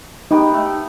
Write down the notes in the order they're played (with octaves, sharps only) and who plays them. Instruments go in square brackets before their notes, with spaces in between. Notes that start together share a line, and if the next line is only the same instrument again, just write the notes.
[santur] B3 G4 B4 [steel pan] D#4
[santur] A3